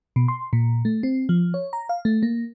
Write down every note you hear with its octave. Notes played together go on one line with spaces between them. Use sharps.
B2
C6
A#2
A3
C4
F3
C#5
A#5
F5
A3
A#3